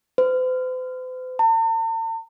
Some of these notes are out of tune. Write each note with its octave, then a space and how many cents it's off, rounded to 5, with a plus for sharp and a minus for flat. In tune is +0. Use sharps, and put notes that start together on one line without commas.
C5 -45
A5 +45